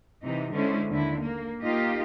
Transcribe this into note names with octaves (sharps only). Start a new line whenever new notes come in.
C3 E3 D#4
D3 G#3 C#4 E4 C5
D#2 D3 E4
A#3
A#3 D#4 F4 G4 D#5